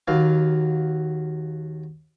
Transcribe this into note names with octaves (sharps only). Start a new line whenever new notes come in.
D#2 F#3 F5